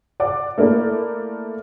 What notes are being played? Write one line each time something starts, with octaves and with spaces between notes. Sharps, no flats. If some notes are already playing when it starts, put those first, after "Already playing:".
D5 F#5 D6
A3 A#3 E4 D5